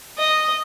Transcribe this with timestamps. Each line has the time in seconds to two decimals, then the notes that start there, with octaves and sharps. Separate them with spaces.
0.18 D#5